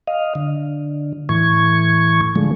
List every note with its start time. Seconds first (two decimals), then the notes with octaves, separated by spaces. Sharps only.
0.07 D#5 F5
0.35 D3
1.29 A2 E3 C#6 G#6
2.36 D3 F3 G#3 A3